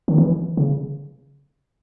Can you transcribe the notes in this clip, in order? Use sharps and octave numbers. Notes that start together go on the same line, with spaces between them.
D#3
E3
C#3